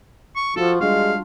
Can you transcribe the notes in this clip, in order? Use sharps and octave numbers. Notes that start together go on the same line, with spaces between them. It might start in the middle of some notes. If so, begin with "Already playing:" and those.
C#6
F3 F4 F#4 A4
G3 G#3 D4 F4 F5